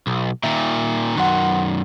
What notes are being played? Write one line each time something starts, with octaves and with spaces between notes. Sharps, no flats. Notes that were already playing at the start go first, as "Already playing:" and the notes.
B1
A#2 D#3 E5
F#2 D#3 F#5 C6 F#6